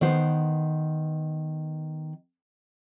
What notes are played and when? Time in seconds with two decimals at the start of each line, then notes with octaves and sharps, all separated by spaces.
0.01 D#3 B3 C5